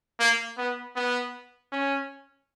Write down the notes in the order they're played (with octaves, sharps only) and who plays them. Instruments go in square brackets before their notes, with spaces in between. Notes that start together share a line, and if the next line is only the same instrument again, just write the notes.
[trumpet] A#3
B3
B3
C#4